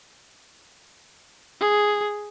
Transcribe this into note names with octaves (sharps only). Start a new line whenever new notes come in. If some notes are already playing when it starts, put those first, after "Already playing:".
G#4